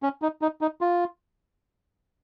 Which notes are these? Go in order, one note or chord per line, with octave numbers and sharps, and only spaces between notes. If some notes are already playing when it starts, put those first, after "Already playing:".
C#4
D#4
D#4
D#4
F4